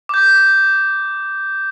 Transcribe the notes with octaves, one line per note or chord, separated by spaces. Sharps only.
D6 G6